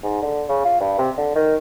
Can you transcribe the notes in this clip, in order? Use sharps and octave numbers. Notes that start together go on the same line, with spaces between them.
G#2
D3
C#3
F4
G2
C3
D3
D#3